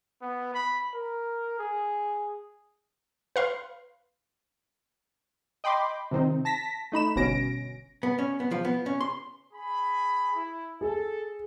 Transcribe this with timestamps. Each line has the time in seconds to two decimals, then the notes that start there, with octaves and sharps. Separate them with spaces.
0.22 B3
0.54 B5
0.93 A#4
1.59 G#4
3.36 B4 F5 C6
5.64 D#5 G5 B5 C6 D6
6.11 C3 D#3 C4 D#4
6.45 A5 A#6 B6
6.92 A3 D#4 B5 E7
7.16 G1 B2 C#4 A#6 D7
8.03 B3
8.19 C#4
8.40 B3
8.51 F3
8.65 B3
8.86 C#4
9.01 C6
9.53 G#4 B5
10.34 E4
10.81 G#4 A4